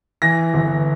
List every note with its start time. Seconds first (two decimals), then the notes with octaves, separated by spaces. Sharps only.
0.22 E3 A#6
0.54 G1